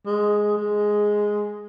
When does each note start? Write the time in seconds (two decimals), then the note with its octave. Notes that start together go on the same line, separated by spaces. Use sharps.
0.06 G#3
0.57 G#3